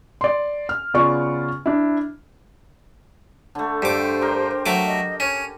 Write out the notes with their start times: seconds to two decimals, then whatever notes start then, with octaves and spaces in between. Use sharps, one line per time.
0.21 D5 C6
0.69 F6
0.94 C#3 B3 F4 D5 C#6
1.66 D4 E4
3.55 D3 A3
3.82 G2 G4 A4 C5 D6
4.21 G4 A#4
4.66 F#3 A3 D6
4.86 D#5
5.20 C#4 C#5